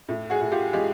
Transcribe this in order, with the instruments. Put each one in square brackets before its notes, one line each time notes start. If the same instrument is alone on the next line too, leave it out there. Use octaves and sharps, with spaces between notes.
[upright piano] A2
F#4 G#4
A2
F4 G4
G#3 F4 G4